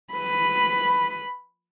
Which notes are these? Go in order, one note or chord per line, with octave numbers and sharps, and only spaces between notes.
B4 B5